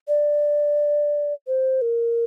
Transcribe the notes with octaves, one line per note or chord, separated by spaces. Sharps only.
D5
C5
A#4